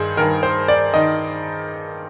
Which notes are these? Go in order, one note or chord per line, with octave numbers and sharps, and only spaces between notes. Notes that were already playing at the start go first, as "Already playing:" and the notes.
Already playing: G2 D#3 G#4 C5
G2 D#3 A#4
C5
D5
D#3 D#5